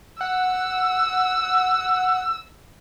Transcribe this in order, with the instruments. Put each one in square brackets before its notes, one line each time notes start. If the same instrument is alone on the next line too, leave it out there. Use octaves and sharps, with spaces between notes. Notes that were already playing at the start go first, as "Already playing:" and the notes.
[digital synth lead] F#5 [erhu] E6